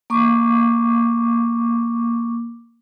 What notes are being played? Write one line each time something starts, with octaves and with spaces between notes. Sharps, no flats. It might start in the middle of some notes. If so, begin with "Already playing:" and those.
A#3 C#6 D6